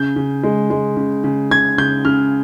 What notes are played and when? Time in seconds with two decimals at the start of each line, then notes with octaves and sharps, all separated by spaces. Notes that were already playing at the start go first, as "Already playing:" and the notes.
Already playing: C#3 G6
0.16 C#3
0.44 G#3
0.70 G#3
0.97 C#3
1.24 C#3
1.51 C#3 G#6
1.78 C#3 G6
2.05 C#3 F6